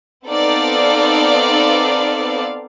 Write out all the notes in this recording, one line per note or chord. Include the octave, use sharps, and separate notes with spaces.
B3 C4 D#4 A4 D5 F5